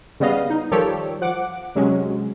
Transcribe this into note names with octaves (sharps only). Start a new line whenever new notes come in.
C#3 G3 B3 D#5 F5
D#4
D#3 F3 G3 G4 A4 C#5
F3 F#5 D6
C3 F#3 G#3 C#4